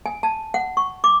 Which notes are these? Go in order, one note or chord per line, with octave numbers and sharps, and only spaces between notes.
G#5
A5
F#5
C#6
D6